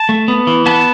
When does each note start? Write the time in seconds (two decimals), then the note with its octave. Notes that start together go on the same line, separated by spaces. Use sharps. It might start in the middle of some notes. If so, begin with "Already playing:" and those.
Already playing: A5
0.09 A3
0.28 B3
0.47 E3
0.66 B3 A5